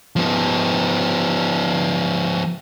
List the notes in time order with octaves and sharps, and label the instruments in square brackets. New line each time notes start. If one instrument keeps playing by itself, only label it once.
[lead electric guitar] F3 B3